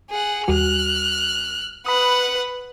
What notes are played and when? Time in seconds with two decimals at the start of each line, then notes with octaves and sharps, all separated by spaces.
0.10 G#4 F#5
0.48 D#2 G3 F#4 F6 F#6
1.86 B4 F#5 B5 D#6